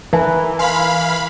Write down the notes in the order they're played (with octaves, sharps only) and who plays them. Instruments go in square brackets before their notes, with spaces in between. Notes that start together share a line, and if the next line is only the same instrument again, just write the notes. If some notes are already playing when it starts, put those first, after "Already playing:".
[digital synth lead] E3 [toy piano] D#4 E5 G#5 [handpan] A#4 B4
[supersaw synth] F5 B5 [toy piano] G#5 C6